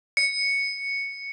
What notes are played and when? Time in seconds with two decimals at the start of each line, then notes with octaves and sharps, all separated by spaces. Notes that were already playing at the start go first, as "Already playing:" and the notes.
0.17 C#7